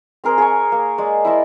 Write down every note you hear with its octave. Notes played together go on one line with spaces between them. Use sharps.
C4 G#4 A#4 C5
G#4 C5 C#6
A#3
G#3 D5
E4 C5 D#5 A5